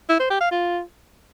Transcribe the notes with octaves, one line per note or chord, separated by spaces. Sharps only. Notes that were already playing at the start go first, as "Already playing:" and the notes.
E4
C5
G4
F5
F4